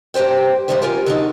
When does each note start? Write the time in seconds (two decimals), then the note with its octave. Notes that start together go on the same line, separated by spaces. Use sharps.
0.14 G2 A#3 G4 C5 G5
0.68 G#2 C3 F3 G3 C5 E5
0.82 C#4 F4 G4 A#4 G#5
1.06 D3 F#3 D#4